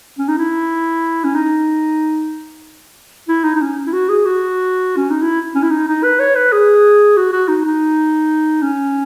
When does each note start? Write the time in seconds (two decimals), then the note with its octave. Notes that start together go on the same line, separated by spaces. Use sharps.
0.18 C#4
0.28 D#4
0.38 E4
1.24 C#4
1.35 D#4
3.28 E4
3.44 D#4
3.56 D#4
3.61 C#4
3.87 E4
3.93 F#4
4.09 G#4
4.26 F#4
4.97 C#4
5.10 D#4
5.23 E4
5.55 C#4
5.63 E4
5.71 D#4
5.87 D#4
6.03 B4
6.20 C#5
6.35 B4
6.52 G#4
7.17 F#4
7.32 F#4
7.48 D#4
7.65 D#4
8.62 C#4